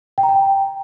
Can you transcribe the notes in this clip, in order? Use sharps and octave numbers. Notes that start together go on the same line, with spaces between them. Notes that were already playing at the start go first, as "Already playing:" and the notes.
G5
A#5
G5